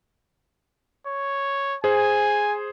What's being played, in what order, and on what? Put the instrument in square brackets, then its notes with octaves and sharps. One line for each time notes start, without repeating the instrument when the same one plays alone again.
[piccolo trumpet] C#5
[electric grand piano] G#4 C5 [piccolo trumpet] G#5